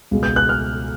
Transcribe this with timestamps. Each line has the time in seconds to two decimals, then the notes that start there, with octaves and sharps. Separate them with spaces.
0.11 C#2 B2 G#3
0.23 G6
0.36 F#6
0.49 F6